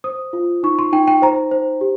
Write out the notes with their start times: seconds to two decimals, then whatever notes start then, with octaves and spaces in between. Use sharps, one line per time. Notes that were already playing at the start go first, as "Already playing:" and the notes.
0.04 C5 D#6
0.33 F4
0.63 D#4 C#6
0.79 C6
0.93 D#4 G5
1.08 G5
1.22 C5 A#5
1.51 C5
1.81 G4